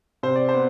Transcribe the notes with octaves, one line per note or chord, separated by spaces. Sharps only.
C3 C5
D5
C5
B3